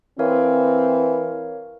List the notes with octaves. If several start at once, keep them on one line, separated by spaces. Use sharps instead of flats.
E3 C4 A#4 C#5 F5